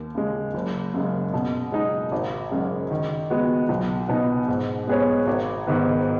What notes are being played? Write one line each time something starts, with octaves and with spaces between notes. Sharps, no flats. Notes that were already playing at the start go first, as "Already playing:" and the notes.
Already playing: D#2
C#3 G#3
F#1
F#2 C#3 G#3
B2
G#3 D#4
G#1
F#2 C#3 G#3
D#3
G#3 B3 F#4
B1
B2 B3 D#4
G#2
G#3 B3 G#4 C#5
G#1
G#2 D#3 B3